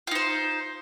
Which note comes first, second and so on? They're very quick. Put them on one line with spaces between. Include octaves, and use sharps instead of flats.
F4 D#4 C5